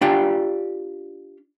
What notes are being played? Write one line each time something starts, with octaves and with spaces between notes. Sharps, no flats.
D4 F4 G4 D5 G5